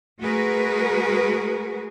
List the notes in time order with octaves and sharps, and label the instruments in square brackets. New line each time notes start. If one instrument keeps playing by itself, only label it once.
[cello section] G#3 A3 F#4 G#4 A#4 B4